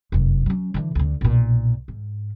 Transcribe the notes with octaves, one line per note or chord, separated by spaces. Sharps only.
F1 F#2
F#3 C#4
D3 E3
D2 D3
B1 A#2
G#2